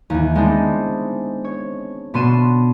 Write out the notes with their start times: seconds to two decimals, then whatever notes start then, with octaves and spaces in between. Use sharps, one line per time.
0.10 D#2 E3
0.35 G#3 B3 C4 D4 D#4
1.45 C#5
2.14 B2 B3 D4 C6 D#7 E7